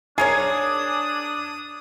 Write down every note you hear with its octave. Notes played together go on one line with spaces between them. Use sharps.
D4 G#4 A#4 C#5 D#6 G#6